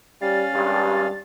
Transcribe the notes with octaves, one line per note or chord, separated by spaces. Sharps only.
G3 C#4 F5 A6
G#1 G2 G3